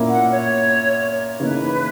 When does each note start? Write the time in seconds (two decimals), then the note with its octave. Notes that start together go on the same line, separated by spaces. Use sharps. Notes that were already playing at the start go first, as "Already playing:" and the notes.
Already playing: A#2 A#3 C#4 E4
0.09 F#5
0.30 C#5
1.40 C#3 E3 A#3 D#4 B4